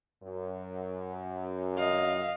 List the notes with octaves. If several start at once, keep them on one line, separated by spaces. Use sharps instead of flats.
F#2
D#5 F5